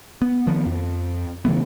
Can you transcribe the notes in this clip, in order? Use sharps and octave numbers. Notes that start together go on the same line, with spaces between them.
B3
D#3 F3 B3
F2
C#3 E3 A3 B3